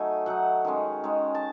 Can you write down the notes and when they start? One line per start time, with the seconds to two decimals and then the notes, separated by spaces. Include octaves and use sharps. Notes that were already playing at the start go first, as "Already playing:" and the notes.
Already playing: F#3 A3 D#4 G#5
0.26 F#3 A3 D#4 F#5
0.65 D#3 G#3 C#4
1.04 D#3 G#3 C#4
1.35 A5